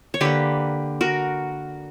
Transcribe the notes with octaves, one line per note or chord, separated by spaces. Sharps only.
C#5
D3 A#3 G4 B4
F#4 A#4